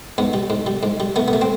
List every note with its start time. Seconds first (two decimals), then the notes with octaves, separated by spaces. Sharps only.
0.18 G#2 B3
0.33 G3
0.50 G#2
0.66 G3
0.83 G#2
1.00 G3
1.16 A3 B3
1.28 B3
1.33 A3
1.41 C4